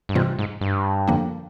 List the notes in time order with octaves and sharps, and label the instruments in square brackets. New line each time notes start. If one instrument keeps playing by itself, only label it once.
[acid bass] G2
[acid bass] G#2 [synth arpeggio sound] C3 E3 G3 C4 F4
[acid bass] G#2
G2
[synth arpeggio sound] F2 D3 F3 A#3 D4